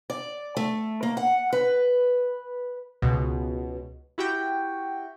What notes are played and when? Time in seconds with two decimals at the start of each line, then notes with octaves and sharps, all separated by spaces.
0.10 D5
0.57 A3
1.03 A#3
1.17 F#5
1.53 B4
3.02 C#2 B2
4.18 E4 F#4 G4 G5